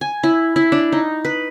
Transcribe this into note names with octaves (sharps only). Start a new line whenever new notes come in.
G#5
E4
E4
D4
D#4
B4